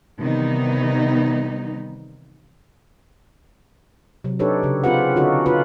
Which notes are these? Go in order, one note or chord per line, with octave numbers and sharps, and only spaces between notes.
C3 D#3 E3 G3 B3 D#4
C3 F#3
D4 D#4 G4 A4 B4 C#5
C#3
C4 C#4 F4 G4 B4 F#5
D3 C#4 D#4 F4 F#4 A4
C#4 F4 F#4 B4